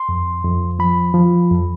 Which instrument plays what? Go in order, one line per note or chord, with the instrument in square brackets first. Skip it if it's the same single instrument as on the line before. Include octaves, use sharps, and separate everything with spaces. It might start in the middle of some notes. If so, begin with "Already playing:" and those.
Already playing: [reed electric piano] C6
F2
F2
F3 B5
F3
F2